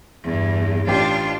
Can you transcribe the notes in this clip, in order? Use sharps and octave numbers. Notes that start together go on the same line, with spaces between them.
E2 G2
A1 D4 F4 G4